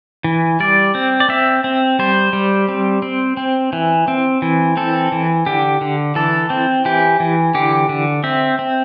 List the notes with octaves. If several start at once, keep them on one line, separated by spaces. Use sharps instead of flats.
E3
G3 D5
C4
D5
C4 E5
C4
G3 C5
G3
C4
C4
C4
E3
C4
E3
C4 A4
E3
D3 G4
D3
E3 A4
C4
E3 G4
E3
D3 G4
D3
C4 E5
C4